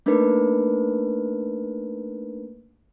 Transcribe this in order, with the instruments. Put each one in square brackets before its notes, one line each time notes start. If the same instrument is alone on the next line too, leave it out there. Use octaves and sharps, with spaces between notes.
[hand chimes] A3 A#3 D4 D#4 A#4 B4